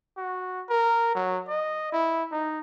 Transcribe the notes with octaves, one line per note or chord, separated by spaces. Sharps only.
F#4
A#4
F#3
D#5
E4
D#4